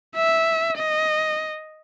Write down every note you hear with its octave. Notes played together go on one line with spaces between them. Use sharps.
E5
D#5